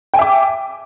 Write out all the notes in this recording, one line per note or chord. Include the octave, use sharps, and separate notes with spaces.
E5 G5 G#5 D6